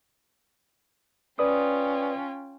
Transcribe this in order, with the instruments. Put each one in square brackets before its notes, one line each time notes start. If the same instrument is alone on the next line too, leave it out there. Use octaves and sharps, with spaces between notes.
[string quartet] C#4 F4 G5 [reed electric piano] B4 D5 D#6